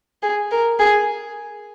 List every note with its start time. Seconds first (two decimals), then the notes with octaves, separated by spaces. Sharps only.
0.23 G#4
0.51 A#4
0.79 G#4